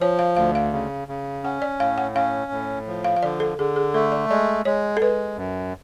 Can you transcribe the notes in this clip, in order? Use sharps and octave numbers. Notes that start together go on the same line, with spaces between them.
F3 C#5
F5
D2 F5
F5
C#3
C#3
C#4 F#5
D5
A2 F5
F#5
C#4 F5
A2
F3
F5
F5
D3 D5
A4
D3 G#4
G#4
A3 A4
D5
G#3 D5
G#3 C#5
A4
G#3 B4
F#2